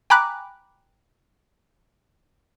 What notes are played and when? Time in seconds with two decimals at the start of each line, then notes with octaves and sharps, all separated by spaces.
0.10 G5 G#5 A#5 B5 D6 F#6